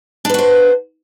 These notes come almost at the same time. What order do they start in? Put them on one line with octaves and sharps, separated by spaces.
D4 B4 F#4 C5